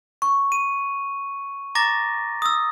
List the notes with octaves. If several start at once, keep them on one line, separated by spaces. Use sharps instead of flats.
C#6
D#7
A#5 D6 A6 A#6
D#6 E6